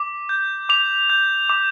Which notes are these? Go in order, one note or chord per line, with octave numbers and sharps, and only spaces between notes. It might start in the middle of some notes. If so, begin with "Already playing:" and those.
Already playing: D6
G6
D6 F7
G6
D6